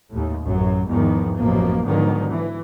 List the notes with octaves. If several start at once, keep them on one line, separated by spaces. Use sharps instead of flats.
D#2 A2
A1 F#2 F#3
E2 G#2 D#3 F3
A1 F#2 B2 F3 A#3
G#2 B2 D3 D#3 F3 F#3
E3